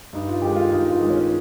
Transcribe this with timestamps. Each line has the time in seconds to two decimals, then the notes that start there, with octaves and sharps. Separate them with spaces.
0.13 G2 D#4
0.29 F4
0.42 D#3 G#3 G4
0.56 F4
0.72 G2 D#4
0.91 F4
1.00 D#3 G#3
1.10 C#4